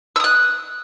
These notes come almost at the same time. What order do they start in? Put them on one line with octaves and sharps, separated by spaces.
E6 D#6 F#6